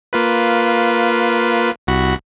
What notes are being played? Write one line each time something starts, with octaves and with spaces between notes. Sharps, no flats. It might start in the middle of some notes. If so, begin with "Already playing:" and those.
A#3 F4 B4
C2 F#4 B5